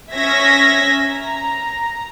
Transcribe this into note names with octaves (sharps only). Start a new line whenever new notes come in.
C#4 E5 G#6 A#6 B6
A#5